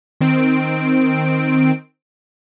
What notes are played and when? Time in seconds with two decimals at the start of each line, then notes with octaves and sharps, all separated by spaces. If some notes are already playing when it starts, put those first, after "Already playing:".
0.21 D#3 C4 D7